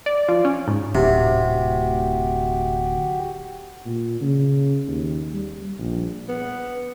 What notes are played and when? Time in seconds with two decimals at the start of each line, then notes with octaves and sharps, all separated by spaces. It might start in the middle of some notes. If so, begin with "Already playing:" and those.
0.06 D5
0.28 F3
0.45 C#4
0.68 G#2
0.95 D1 C3 F#4 G4
3.85 A#2
4.21 C#3
4.88 D#2
5.34 G3
5.79 A#1
6.29 B3